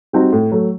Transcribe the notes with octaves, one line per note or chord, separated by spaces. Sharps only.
G3 C4 D#4 F#4
A2
F#3 A3